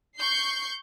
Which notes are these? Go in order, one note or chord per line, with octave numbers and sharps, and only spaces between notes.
C#6 G6 C7